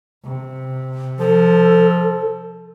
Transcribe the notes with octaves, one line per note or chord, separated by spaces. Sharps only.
C3
F3 A4